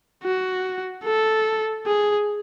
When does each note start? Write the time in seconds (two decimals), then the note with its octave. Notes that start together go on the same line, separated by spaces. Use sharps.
0.24 F#4
1.05 A4
1.86 G#4